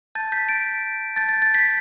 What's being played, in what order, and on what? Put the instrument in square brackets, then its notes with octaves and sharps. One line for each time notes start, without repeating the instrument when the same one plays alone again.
[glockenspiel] A5 G6 A6
G6 B6
A6 D7
A5 G6 A6
A6
A6
G6 B6